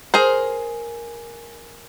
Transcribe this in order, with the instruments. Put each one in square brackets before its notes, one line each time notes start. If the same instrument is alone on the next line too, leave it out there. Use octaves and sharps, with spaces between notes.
[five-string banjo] G#4 A#4 C5